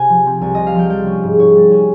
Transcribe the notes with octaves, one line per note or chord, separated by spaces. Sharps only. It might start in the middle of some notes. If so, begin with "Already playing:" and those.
Already playing: C3 G#5
F3
C4
C2 G#5
C3 D#5
F5
F3 G5
G3 G5
C#4
G#2
G#2 C#5
G3
C#4